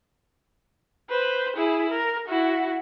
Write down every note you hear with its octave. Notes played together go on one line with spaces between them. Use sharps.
B4 C5
E4 G#4
A#4
E4 F#4